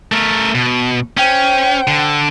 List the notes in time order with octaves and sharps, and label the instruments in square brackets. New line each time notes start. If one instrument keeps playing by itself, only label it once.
[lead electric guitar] A3 A#4
B2
[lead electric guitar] C#4 [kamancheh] C5 G5
[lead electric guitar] D3